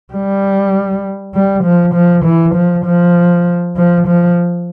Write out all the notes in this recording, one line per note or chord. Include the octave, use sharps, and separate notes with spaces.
G3
G3
F3
F3
E3
F3
F3
F3
F3